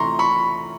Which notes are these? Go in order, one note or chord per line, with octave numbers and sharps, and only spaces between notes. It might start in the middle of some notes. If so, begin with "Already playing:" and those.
Already playing: C3 E3 A3 A#5 C6 C#6
B5 C#6